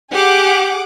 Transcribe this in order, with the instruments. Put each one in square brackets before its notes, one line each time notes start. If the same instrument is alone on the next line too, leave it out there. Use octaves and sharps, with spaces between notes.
[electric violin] G4 [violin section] G#4 F#5 D6